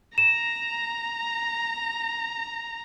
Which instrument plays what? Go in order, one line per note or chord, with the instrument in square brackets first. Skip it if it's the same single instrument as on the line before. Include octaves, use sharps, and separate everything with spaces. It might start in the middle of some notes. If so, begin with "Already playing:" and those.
[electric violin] A#5 [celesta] E7